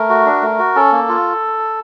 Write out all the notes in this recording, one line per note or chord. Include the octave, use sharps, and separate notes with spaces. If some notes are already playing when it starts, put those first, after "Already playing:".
Already playing: A3 A#4
F#4
D4
A3
F#4
C#4 A4
A#3
F4